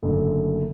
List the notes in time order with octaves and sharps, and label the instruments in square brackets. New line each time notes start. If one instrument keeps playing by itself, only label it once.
[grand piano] F#1 F#2 D3 A3